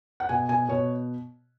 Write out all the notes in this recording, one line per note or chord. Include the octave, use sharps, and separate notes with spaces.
F#5
B2 G#5
B2 G#5
B2 C#5